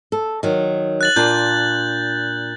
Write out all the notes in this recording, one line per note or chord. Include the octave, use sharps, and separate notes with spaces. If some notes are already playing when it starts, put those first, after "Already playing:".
A4
D#3 F#3
F#6 A6 F#7
A#2 D4 F4 G6